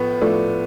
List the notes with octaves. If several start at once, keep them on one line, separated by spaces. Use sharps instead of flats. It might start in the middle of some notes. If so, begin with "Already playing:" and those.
Already playing: A2 F3 A3 B3
A2 F3 A3 D4